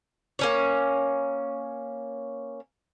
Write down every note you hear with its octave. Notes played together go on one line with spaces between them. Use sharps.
A#3 C#4 C#5